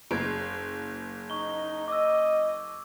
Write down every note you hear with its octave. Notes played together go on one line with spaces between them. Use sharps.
F#1 G#6 D7
D#4 C#6 G7
D#5 D6 E6